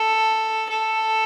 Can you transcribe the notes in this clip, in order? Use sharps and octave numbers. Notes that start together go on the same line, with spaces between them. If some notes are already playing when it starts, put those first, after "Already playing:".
Already playing: A4
A4